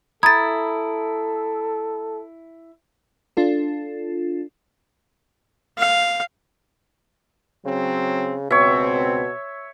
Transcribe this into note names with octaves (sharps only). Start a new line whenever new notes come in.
E4 A4 A#5 B5 D#6 G#6 A6
D4 F4 A4
F5
C#3 F#3 C4
C#2 B2 C4 C#5 E5